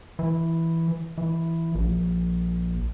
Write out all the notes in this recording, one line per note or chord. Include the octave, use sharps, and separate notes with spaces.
E3
E3
A#1